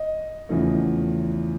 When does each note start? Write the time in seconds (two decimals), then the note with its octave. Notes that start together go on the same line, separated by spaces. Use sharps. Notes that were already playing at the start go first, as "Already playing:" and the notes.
Already playing: D#5
0.49 E2 C#3 F3 A3